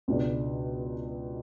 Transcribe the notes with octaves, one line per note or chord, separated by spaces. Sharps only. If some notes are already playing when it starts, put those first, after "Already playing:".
C#2 B2 G#3 D4